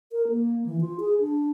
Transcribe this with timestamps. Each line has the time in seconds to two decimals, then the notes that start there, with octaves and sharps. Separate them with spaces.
0.12 A#4
0.29 A#3
0.66 E3
0.81 F4
1.00 G#4
1.20 D4